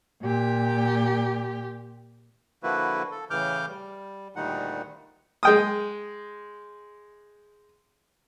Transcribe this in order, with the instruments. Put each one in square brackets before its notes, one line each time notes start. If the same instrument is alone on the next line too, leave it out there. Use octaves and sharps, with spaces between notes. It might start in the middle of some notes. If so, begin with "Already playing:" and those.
[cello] A#2 G4
[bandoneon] D3 F3 A#3 E4 F#4 B4
A4
A2 C#3 E3 D6 F6 G6
G3
D2 A#2 D#3 G3 D#4 F#5
[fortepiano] G#3 G5 D#6